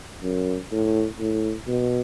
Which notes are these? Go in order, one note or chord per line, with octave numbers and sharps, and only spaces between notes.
F#2
A2
A2
B2